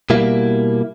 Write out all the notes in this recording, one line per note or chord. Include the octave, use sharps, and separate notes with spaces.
B2 G3 A#3 E4